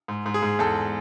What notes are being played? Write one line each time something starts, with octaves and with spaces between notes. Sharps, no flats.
G#2
G#2
G#4
G#2
E2 A4